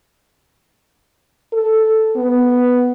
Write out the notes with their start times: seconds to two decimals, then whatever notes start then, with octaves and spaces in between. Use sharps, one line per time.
1.53 A4
2.16 B3